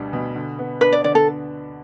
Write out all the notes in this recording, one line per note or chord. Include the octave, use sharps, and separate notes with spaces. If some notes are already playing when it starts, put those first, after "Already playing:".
Already playing: D2 B2 G3 D4
B2
D3
B3
D4 B4
D5
D3 D5
A4